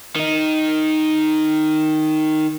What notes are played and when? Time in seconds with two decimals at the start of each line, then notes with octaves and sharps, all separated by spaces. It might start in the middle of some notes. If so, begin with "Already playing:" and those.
0.16 D#3 D#4